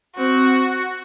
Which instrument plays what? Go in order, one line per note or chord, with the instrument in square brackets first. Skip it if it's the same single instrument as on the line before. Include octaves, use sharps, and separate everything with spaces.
[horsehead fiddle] C4 [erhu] F#4